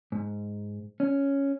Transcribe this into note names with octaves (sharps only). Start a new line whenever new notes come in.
G#2
C#4